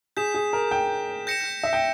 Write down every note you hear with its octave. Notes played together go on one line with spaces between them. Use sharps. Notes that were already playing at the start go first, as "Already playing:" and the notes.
G#4 G6 B6 E7
G#4
A#4
G5
G6 A#6 C#7 E7
E5
G5